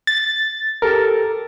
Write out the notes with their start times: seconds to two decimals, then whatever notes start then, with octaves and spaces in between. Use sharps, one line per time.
0.07 A6
0.82 G4 A4 A#4